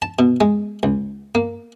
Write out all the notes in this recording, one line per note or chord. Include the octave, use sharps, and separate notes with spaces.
A5
B2
G#3
C#2
A#3